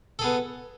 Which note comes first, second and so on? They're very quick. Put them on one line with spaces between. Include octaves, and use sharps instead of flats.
A4 G#4 B3